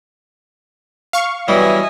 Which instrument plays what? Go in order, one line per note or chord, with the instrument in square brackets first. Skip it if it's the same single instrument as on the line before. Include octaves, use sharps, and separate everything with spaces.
[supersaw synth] F5 C#6
[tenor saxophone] E3 [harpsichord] F#3 G3 B3 [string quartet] D#5 E5 G#5